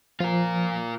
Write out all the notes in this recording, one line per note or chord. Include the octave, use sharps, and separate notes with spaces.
F3 F4 A#4